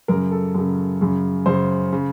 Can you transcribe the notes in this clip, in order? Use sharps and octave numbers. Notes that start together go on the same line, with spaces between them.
F#2 C#3 A#4
A4
F#2 C#3
F#2 C#3
F#2 C#3 C5
C#3